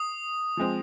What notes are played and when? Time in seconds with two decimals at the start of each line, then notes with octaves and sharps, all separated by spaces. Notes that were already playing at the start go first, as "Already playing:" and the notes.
Already playing: D#6
0.57 F3 G#3 C4